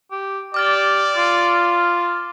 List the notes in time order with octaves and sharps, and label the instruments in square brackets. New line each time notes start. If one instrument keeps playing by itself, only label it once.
[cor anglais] G4
[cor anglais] G4 [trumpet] D5 [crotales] D6 F6 A6
[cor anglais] F4